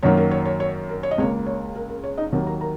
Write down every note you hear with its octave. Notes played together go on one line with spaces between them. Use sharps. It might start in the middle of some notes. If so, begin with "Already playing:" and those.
F#2 D#3 F#3 A#3 C#5
A#4
C#5
C#5
C#5
A#4
C#5
D#5
C#2 C#3 A#3 C#5
C#5
A#4
A#4
C#5
D#4 D#5
D#2 D#3 F#3 A#3 A#4
A#4 A#5
A#4 A#5